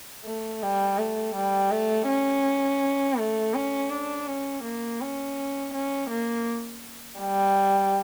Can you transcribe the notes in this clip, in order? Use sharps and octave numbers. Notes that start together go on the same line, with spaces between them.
A3
G3
A3
G3
A3
C#4
A3
C#4
D4
C#4
A#3
C#4
C#4
A#3
G3